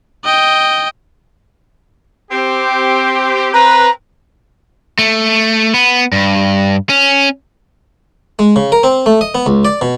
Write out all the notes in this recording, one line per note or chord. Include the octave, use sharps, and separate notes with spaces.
D#5 G5
C4 G4
C4 B4 A#5
A3
B3
G2
C#4
G#3
C#3
A#4
C4
A3
D#5
B3
C#2
D5
B2